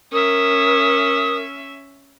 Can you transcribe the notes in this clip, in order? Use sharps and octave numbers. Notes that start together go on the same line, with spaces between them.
C#4 A#4 E5 D#6